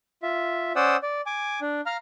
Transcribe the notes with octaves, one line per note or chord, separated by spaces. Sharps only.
F4 E5
C#4 C5 D5 F#5 D#6 E6
D5
G#5 D6
D4
F5 A#5 F6